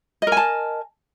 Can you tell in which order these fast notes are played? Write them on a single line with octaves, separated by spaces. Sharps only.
D#5 A#4 G#5 A5